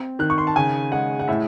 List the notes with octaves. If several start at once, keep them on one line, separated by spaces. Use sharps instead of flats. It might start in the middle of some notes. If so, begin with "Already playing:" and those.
Already playing: C4
D#3 F#6
C#6
C6
A5
C#3 G#5
G#3 F#5
F#5
A2 E5